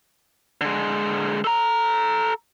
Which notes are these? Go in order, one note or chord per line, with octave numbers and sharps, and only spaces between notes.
D3 G#3
A4 A#5